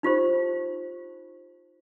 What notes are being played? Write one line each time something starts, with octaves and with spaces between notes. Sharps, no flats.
D#4 F4 G4 C5